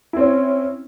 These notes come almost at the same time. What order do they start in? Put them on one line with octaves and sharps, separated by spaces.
E4 C4 C#4